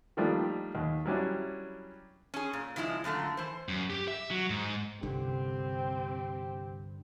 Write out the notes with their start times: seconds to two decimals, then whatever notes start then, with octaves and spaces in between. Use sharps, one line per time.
0.17 D#3 F3 G3 A3 A#3 D4
0.75 D#2
1.06 F#3 G3 C#4 D4 E4
2.34 C#4 G#4
2.53 A#2
2.76 C#3 F3 G#3 E4
3.04 F#2 A#2 D3 A3
3.37 E3 C5
3.69 F#2
3.90 G4
4.08 E5
4.31 F#3
4.50 G#2
5.03 C2 G2 D3 C4 C#4 G4